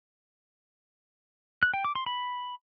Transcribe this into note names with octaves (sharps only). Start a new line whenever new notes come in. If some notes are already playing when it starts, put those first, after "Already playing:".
F#6
G5
D6
C6
B5